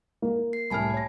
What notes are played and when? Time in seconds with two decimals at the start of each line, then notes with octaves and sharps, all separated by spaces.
0.22 A#3
0.53 C7
0.70 C2 A2 G#5 A5 B5 F6
0.94 C#5 A#6